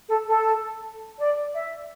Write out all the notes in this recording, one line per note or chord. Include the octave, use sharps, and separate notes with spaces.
A4
A4
D5
E5